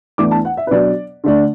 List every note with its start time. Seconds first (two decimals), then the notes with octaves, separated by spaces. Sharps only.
0.18 E2 E3 A3 D4 D6
0.31 A5
0.45 F#5
0.57 E5
0.67 B4
0.71 B2 F#3 D4 D5
1.24 D3 A3 D4